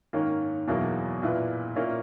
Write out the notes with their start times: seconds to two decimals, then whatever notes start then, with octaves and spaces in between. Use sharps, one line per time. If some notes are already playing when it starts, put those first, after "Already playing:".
0.13 G#2 D#3 A#3 C#4
0.67 E2 B2 F#3 A#3 E4
1.22 A#2 A#3 E4 B4
1.76 A#2 A#3 C#4 E4